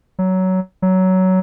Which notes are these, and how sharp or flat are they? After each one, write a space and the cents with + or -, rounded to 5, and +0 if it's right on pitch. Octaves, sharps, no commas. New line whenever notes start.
F#3 +15
F#3 +15